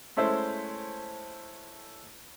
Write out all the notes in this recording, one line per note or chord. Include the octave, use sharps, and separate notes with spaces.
G#3 A3 C#4 E4 A4 C5